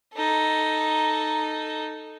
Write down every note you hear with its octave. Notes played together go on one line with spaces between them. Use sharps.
D#4 A4